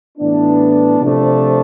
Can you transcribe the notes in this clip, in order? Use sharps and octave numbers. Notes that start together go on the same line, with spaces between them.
A2 E3 B3 D4
C3 F3 A3 D4